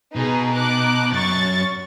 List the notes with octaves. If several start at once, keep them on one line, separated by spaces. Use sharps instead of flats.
B2 D#4 G#4 B4
D#4 D6 F#6
F#2 C#6 A6